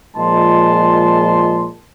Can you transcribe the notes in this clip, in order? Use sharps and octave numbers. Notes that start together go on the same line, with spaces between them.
A#2 F3 G#3 D#4 A5 C6